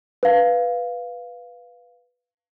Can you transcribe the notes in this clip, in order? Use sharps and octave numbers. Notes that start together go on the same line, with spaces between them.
B4 F5